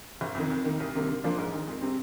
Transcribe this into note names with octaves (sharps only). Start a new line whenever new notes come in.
G1
F2 D#3
F2
D#3 A#3
C2
C3 D#3 G3 A#3
D3
F3 A#3 D4 F4
G#2
D#3 G#3
F2
C3 G3 C4